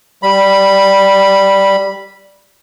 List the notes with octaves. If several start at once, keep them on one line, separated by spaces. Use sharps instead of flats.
G3 B5